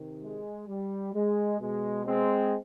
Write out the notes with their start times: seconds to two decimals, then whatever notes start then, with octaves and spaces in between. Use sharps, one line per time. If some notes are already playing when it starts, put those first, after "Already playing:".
Already playing: C3 D#3
0.22 G#3
0.67 G3
1.13 G#3
1.60 B2 G#3
2.06 G#3 C4